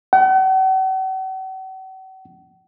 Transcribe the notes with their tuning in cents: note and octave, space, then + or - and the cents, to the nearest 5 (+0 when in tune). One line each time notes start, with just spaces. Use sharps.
F#5 +45